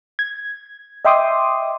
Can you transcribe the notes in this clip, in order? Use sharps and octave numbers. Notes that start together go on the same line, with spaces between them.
G#6
D#5 E5 G5 C6 D6 D#6